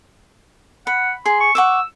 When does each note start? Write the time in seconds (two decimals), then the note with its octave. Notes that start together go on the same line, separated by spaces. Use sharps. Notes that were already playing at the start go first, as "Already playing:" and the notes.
0.87 F#5 B5
1.26 G#4 C6
1.41 C#6
1.55 F#5 C#6 D6 E6